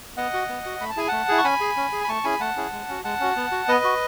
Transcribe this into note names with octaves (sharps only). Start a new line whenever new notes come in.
B3 D#5 F#5
F#4
B3
F#4
A3 B5
A5
E4 G#4 G#5
A3 F#5 A5
E4 G#4
C#6
C#4 G#5 B5
G#4
C#4
G#4
B5
A3 A5 C#6
C#4 E4 G#4 G#5 B5
A3 F#5 A5
C#4 E4 G#4
G#3
C#4 F#4
G#3 F#5 A5
C#4 F#4
B3
F#4
B3 B4 D#5
F#4